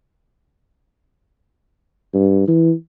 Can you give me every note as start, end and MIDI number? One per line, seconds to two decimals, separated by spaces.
2.14 2.43 43
2.48 2.72 52